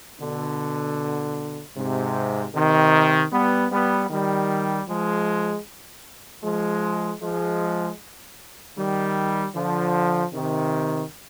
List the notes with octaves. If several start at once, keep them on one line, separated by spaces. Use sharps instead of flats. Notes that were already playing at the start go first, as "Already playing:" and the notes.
B2 D3
G#2 C3
C3 D#3
G3 B3
G3 B3
D#3 G3
F3 G#3
F3 G#3
F3 G#3
D#3 G3
D3 F3
C3 D#3